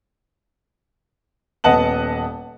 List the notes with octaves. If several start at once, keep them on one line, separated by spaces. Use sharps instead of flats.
D#1 B3 D#5 F#5 A5 F#7